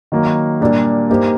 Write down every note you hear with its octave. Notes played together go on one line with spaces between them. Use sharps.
D#3 F#3 A#3
A#2 G3 A#3 D4 G4
A#3 D#4 G4 C5